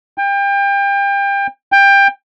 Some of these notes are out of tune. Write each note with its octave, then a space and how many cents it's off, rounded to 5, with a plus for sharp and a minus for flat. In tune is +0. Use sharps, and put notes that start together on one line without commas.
G5 +30
G5 +20